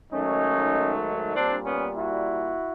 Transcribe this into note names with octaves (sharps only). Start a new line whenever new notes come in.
G#2 D#3 F#3 A3 C#4 D#4
A#2 G3 C4 D4
B3 C#4
E4 F#4